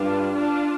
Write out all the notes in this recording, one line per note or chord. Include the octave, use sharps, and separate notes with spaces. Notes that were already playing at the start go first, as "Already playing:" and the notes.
Already playing: G2 D4 F4
D4 F4